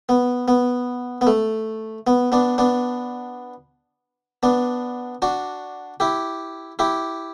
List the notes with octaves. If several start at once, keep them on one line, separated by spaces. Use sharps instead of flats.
B3
B3
B3
A3
B3
B3 D4
B3 D4
B3 D4
D4 F#4
E4 G4
E4 G4